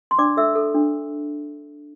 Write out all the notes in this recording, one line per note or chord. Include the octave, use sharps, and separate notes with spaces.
C6
D4 D5 D6
A4 E5 E6
A4
D4